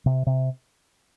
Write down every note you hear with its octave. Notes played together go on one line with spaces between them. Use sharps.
C3
C3